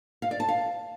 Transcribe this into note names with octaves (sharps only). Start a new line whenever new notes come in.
F5
D5
A5
F5